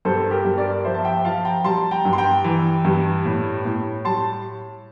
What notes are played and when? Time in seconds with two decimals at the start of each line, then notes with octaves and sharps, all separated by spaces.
0.05 G2 A4 C5
0.20 C5
0.31 G4 A#4
0.45 G2
0.58 A#4 D5
0.84 F3 C5 E5
0.94 A5
1.04 E5 G5
1.25 F3 F5 A5
1.45 G5 A#5
1.64 G3 A5 C6
1.91 G5 A#5
2.05 G2
2.13 C6
2.18 G5 A#5
2.44 E3
2.85 G2
3.25 A2
3.65 A2
4.05 G3 A5 C6